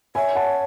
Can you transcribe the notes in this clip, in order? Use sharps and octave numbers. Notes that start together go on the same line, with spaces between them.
C#5 E5 G#5
F#5 A5